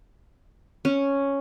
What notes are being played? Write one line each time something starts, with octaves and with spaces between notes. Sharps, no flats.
C#4